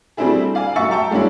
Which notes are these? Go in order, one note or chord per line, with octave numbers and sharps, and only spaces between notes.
G3 A3 C4 D4 E4 G#4
D5 F5 G#5
E5 F#5 C#6 E6 A6 C#7
E5 G5 A5 A#5 C#6
G#3 A#3 C#4 D4 E4